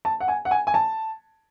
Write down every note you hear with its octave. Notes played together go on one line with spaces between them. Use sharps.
A5
F#5
G#5
F#5
G#5
G#5
A5